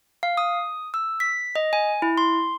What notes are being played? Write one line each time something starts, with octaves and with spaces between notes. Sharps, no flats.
F5
D#6
E6
B6
D#5
G#5
E4
C6